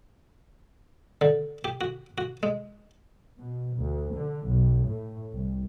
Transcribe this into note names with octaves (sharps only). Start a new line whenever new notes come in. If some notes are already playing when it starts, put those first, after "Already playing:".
D3
G4
F#4
F#4
G#3
B2
D2
D3
B1
A2
C2